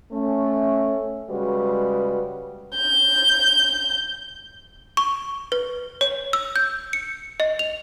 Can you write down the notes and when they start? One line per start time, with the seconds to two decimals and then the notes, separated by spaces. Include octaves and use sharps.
0.12 A3 C#4
1.29 C#3 G3 G#3 F#4 B4
2.76 G6
4.97 C#6
5.52 B4
6.01 C#5
6.33 E6
6.56 G6
6.93 C#7
7.40 D#5
7.59 F7